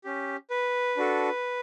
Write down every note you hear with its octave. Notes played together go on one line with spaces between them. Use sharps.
C#4 G4
B4
D4 F#4 A4